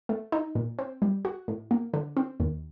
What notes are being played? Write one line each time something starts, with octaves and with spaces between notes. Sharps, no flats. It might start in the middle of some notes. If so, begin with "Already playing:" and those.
A3
D#4
A#2
C4
G3
F#4
A2
A#3
D3
C4
D#2